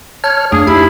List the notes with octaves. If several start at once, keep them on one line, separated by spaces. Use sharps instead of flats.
C#5 A5 F6
F2 A3 D4 G#4
D#4 E4 G4